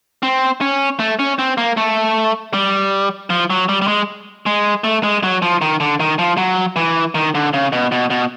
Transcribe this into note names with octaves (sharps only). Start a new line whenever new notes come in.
C4
C#4
A3
C#4
C4
A#3
A3
G3
F3
F#3
G3
G3
G#3
G#3
A3
G#3
F#3
F3
D#3
D3
D#3
F3
F#3
E3
D#3
D3
C#3
B2
B2
B2